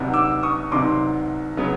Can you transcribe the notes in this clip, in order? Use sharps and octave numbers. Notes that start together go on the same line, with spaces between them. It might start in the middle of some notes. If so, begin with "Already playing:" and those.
Already playing: C2 C3 D#3 F#3 B3
D6 E6
C#6 D#6
C2 C3 D#3 F#3 B3 C6 D6
C#3 F#3 B3